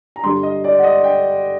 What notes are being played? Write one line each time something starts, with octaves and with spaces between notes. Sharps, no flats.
A#5
G2 D3 G3 C6
D#5
D5
F#5
D#5
G5